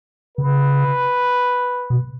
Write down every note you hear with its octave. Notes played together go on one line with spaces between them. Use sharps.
C#3 B4
B2